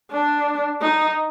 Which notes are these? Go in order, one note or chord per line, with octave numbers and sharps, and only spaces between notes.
D4
D#4